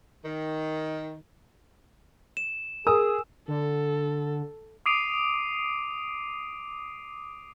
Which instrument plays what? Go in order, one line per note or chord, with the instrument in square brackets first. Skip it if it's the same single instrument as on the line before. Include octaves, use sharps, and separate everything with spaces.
[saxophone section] D#3
[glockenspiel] E7
[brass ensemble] G#4 [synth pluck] A#4 [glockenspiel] G#5 E6 [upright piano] D#6
[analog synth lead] D3 [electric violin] A4
[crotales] D6 D#6 C7 D7 D#7 F7